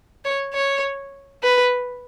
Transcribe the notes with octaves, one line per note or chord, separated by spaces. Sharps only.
C#5
C#5
B4